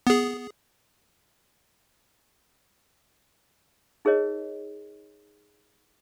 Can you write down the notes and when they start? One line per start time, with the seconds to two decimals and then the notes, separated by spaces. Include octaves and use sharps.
0.07 B3 G#4
4.05 D#4 G#4 A#4 C#5 D#5